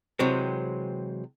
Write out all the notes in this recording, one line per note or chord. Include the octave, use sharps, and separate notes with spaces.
C3 E3 F#3 G#3 C4